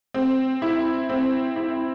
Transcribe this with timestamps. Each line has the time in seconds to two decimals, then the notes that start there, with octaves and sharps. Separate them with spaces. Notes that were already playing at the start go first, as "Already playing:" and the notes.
0.14 C4
0.62 E4
1.09 C4
1.56 E4